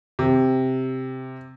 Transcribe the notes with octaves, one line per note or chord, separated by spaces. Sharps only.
C3